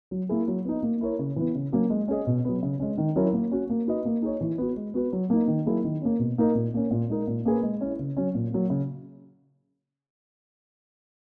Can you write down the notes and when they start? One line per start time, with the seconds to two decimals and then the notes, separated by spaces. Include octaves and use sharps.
0.11 F#3
0.29 A#3 E4 G#4
0.48 F#3
0.65 B3 D#4
0.83 A#3
1.01 E4 A#4 C#5
1.19 C#3
1.36 E3 B3
1.55 C#3
1.72 F#3 A#3 C#4
1.90 G#3
2.08 C#4 G#4 D#5
2.27 B2
2.45 F#3 B3
2.62 C#3
2.79 G#3 C#4
2.98 D#3
3.16 F#3 C#4 E4 A#4
3.33 A#3
3.51 C#4 F#4
3.70 A#3
3.87 D#4 F#4 B4 D#5
4.05 A#3
4.22 D#4 G#4 C#5
4.41 E3
4.58 B3 F#4
4.76 G#3
4.94 B3 F#4 B4
5.13 F#3
5.30 A#3 D#4
5.48 D#3
5.66 F#3 A#3 E4 G#4
5.84 D#3
6.02 A#3 C#4
6.19 B2
6.38 A#3 D#4 A#4
6.55 A#2
6.74 A#3 C#4
6.91 A#2
7.10 G#3 D#4 A#4
7.27 A#2
7.45 A#3 C#4 G#4 B4
7.63 G#3
7.81 C#4 E4
7.99 C#3
8.17 F#3 C#4
8.35 A#2
8.52 F#3 A#3
8.70 C#3